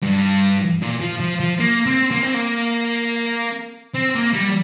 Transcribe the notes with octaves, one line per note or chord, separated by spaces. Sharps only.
G2
A#2
F3
F3
F3
A#3
C4
A#3
C4
A#3
C4
A#3
G3